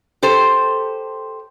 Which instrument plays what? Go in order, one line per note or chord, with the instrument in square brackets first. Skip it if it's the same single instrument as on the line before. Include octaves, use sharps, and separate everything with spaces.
[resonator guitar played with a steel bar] G4 A4 C5